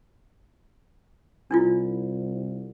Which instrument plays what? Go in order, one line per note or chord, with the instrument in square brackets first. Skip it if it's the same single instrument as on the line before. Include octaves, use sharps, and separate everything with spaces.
[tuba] C2 [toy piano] D4 E4 F4